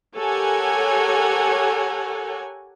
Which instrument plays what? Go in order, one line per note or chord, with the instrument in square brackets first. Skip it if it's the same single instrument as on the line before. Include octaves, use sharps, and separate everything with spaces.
[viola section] G4 A4 A#4 C#5 F#5 G#5